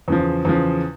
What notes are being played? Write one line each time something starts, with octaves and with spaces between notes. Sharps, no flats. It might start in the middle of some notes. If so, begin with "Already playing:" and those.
E2 C#3 F3
E2 C#3 F3